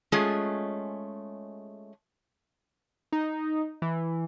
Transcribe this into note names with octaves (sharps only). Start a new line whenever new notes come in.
G#3 A3 C#4 F4 G#4
D#4
E3